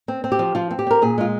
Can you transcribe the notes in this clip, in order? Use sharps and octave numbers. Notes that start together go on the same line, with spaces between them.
C4
C4
G4
F3
F3 F4
C4
G4
C4 A#4
A#2 G#4
G#3 F4